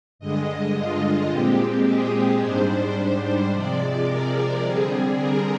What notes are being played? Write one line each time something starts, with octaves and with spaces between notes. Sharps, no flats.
G2 D3 G#3 D#5
F4
A#2 G#3 C4 G4
G#4
G#2 G3 D4 C5
C5
C3 F3 G#3 D5
A#4
D3 G3 C4 G#4
A#4